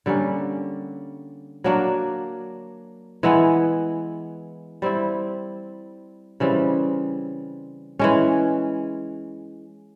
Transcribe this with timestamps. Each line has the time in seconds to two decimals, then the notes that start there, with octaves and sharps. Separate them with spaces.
0.06 D3 G3 A#3 C#4
1.64 F#3 A#3 D4 F#4
3.23 E3 G#3 B3 E4
4.82 G3 C4 E4
6.40 C#3 E3 G3 C4
7.99 E3 G#3 C#4